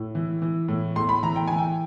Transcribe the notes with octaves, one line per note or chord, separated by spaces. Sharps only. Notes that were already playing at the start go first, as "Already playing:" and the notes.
Already playing: A2
E3
E3
A2
A2 C6
B5
E3 A#5
G5
E3 G#5
G5